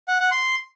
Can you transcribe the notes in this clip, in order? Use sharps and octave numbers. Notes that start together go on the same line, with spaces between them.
F#5
F#5
C6